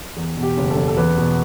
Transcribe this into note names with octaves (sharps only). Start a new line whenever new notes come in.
E2
B2
G4
F#1
A4
F#1
A4
E2 B4
B2